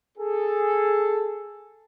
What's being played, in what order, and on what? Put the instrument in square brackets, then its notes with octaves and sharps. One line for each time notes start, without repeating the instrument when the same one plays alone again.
[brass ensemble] G#4 A4